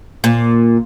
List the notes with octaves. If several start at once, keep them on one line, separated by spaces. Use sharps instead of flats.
A#2